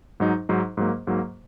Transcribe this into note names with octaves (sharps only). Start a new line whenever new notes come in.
G#2 F#3 D#4
G#2 F#3 D#4
G#2 F#3 A#3
G#2 F#3 A#3